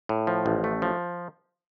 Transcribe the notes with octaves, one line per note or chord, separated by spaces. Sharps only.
A2
F3
A1
A3
F3